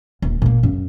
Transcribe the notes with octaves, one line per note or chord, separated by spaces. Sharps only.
D#1
A#2 A#3
F#2